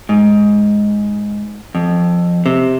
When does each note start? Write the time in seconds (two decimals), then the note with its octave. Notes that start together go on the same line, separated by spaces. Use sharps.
0.09 G#2
1.75 F2
2.46 C3